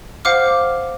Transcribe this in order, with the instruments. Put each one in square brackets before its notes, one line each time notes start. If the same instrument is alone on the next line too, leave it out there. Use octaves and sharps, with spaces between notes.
[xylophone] C5 F5 F#5 D6 F6